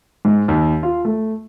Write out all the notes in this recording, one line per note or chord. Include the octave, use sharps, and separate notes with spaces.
G#2
D#2
F4
A3